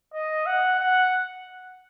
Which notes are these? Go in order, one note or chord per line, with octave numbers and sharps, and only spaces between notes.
D#5
F#5
F#5